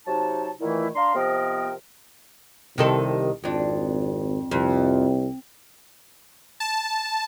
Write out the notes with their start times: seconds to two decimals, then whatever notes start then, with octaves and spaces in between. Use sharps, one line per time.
0.06 C3 F#3 D#4 A5
0.60 A#2 D#3 E3 A3 E4
0.95 D4 F5 A#5 C6
1.15 C3 F3 B3 A#4 D#5 G5
2.78 C2 C3 D#3 A4
3.44 G#1 F2 D4
4.51 C2 F2
6.60 A5